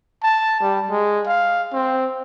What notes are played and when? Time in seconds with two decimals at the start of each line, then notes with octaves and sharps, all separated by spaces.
0.23 A5
0.61 G3
0.90 G#3
1.27 F5
1.73 C4